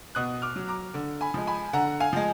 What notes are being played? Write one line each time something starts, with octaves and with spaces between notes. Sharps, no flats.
B2 D#6 F#6
D6 F6
F#3
A#5 D6
D3
G#5 B5
F3 G#3
G#5 B5
D3 F#5 A#5
F5 G#5
F3 G#3